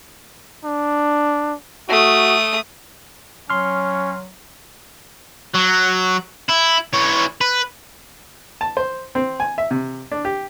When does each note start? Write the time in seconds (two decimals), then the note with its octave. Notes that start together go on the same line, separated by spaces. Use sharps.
0.65 D4
1.89 A3 F#4 D#6
3.50 F#3 C#4 C6 F6
5.55 F#3
6.49 E4
6.93 E3 C#5
7.41 B4
8.61 A5
8.77 C5
9.15 C4
9.40 G#5
9.58 E5
9.71 C3
10.11 D4
10.25 G4